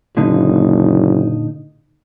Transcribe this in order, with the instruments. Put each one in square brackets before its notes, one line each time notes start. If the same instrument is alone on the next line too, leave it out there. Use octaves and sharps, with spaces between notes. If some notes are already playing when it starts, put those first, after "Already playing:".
[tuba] F#1 [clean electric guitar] A#2 D3 D#4